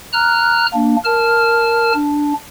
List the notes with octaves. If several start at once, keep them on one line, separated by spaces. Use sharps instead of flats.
A#5 F6 F#6
A#3 D4
A#4 A5 F6
D4